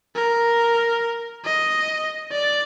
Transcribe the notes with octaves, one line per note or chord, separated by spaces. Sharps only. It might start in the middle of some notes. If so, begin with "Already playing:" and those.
A#4
D#5
D5